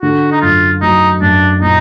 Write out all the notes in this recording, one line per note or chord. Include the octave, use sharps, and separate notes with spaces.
D3 F#4
D#4
F#2 F4
F#3 D#4
F#2 D4
A#2 D#4